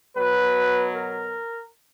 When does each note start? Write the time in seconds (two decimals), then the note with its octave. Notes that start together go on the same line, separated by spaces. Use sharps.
0.16 B2 F#3 B4
0.94 A#4